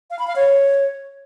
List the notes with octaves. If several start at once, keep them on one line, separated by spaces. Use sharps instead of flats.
F5
B5
F5
C#5